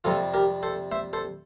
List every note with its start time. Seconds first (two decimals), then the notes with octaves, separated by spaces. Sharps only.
0.04 F2 C3 G3 F4 A4
0.34 G4 A#4
0.63 A4 C5
0.92 C5 E5
1.13 A4 C5